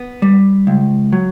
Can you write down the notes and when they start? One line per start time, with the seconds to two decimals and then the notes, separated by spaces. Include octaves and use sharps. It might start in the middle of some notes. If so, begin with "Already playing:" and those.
Already playing: B3
0.22 G3
0.67 C#2
1.13 F#3